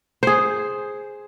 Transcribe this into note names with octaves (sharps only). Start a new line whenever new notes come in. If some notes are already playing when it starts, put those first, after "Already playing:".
G#4 C5